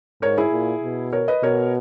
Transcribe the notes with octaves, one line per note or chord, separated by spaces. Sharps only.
G#2 A#4 C#5
E4 G#4
A#2
B2
A#4 C#5
B4 D#5
B2 A#4 C#5